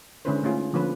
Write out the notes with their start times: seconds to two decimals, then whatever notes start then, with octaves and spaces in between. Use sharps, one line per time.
0.25 D3 G#3 C#4 E4 B4 C5
0.43 A3 C#4 D#4 F4 G#4
0.73 D3 F3 A#3 C#4 G#4 B4